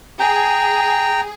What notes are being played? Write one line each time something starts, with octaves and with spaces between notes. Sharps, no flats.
G#4 G5 A#5